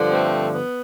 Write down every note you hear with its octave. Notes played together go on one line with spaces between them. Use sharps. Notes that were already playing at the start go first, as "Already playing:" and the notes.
Already playing: G2 D3 F3
A3 C4
B3